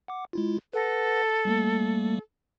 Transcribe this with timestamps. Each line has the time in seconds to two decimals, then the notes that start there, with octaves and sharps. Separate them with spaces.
0.08 F#5 D6
0.33 G#3 E4 F4
0.73 A4 B4 F#5 A#6
1.45 G3 A3 A#3